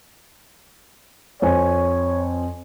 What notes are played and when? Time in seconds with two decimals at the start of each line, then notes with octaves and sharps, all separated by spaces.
1.42 F2 C5 C#5 G#5